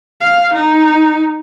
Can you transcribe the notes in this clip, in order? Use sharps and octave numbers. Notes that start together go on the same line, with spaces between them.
F5
D#4